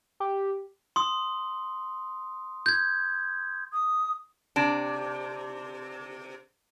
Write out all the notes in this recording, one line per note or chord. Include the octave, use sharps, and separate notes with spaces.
G4
C6 D#6
G6 G#6
D#6
C3 D4